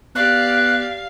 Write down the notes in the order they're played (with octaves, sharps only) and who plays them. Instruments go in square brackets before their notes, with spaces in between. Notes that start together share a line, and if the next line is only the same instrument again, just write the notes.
[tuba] B3 [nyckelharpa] G4 D5 [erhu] F5 [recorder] F#6